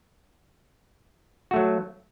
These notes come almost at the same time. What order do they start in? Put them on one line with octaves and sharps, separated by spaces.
F#4 A3 F#3